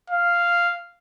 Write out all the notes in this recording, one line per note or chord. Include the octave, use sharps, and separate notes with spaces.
F5